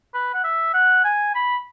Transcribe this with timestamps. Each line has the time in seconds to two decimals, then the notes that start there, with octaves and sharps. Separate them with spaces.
0.14 B4
0.34 F#5
0.44 E5
0.74 F#5
1.05 G#5
1.35 B5